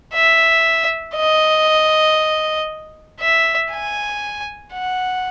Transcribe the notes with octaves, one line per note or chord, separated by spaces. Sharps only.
E5
D#5
E5
G#5
F#5